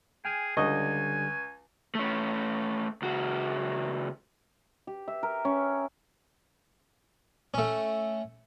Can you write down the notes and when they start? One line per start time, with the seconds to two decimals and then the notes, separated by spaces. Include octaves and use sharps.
0.25 G#4 G5 G#5 F6
0.57 C#2 D3 G3 D#5 G#5 C#6
1.95 A3 C#4
3.02 C#2 F#4
4.87 G4
5.08 E5
5.23 A#4
5.45 C#4
7.54 A3 C#4